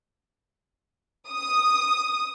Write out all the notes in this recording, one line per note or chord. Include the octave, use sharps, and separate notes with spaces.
D#6